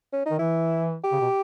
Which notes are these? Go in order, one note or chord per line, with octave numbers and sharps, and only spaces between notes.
C#4
D#3 D#4
E3 E4
G4
C#3
B2